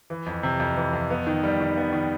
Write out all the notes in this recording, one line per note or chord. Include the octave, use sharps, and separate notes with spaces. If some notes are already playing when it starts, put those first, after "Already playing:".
E3
F2
C3
F2
E3
F2
B3
D#3
G3
D#3
B3
D#3